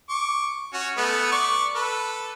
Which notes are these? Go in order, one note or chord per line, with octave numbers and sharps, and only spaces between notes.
C#6 D6
C#4 F#4
A3 B3 B4
D5 C#6
A4 B4